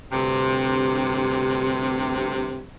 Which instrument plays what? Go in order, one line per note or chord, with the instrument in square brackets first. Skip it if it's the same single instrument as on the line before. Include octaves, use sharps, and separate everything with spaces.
[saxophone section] D2 G2 C3